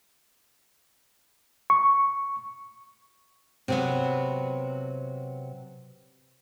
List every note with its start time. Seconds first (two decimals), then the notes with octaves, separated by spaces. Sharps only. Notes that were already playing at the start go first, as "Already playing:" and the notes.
1.70 C#6
3.68 C3 F#3 B3